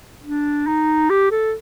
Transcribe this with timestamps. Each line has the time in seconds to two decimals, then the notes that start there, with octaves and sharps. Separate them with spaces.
0.23 D4
0.67 D#4
1.10 G4
1.31 A4